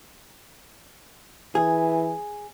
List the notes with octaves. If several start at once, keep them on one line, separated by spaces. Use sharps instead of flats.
E3 G#4